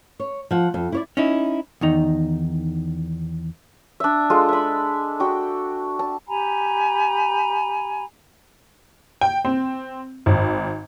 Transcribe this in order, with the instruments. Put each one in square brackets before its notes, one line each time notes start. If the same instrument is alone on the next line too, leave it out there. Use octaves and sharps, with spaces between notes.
[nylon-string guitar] C#5
F3 F#5
F2
E4 C#5 D5
[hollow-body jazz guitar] C#4 D#4 E4
E2 D#3 D#4
[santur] D4 E5
G#3 F4 A4 A5
E5 B5
F#4 G5 D6
A5
[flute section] G4 G#5 A#5 B5
[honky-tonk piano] G5
C4
G#1